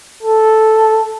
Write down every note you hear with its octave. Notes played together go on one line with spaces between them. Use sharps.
A4